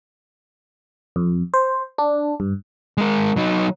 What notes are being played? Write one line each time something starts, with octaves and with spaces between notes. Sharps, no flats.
F2
C5
D4
G2
G#3 A#4
F#3 D#4